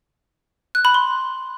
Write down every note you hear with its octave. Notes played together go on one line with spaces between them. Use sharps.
F#6
B5
C6